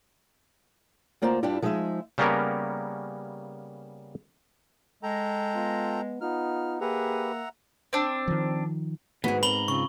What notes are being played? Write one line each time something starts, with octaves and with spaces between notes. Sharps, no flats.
D2 A#3 F4 C5 D5 A#5
G2 G3 D4 E4 F4 G4
F3 G#3 D#4 G#4 E5
C#3 G3 A#3 B3 C#4 A#4
G#3 A4 G5 A#5
B3 F4
B3 D#4 F4 F6
A#3 G4 G#4 B4 E5 F#5 A#5
C4 D4
D#3 F3
E2 G#2 D#3 B3 F#4 G#4
C4 A#4 A#5 B5 F#7 G7
C#3 C4 F4 C#6